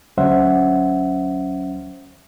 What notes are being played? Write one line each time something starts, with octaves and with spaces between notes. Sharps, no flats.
D2 F#3 C#4 C5 E5 F#5